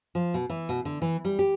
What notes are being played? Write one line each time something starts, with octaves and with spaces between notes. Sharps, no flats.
F3
B2
E3
B2
D3
E3
G3
G4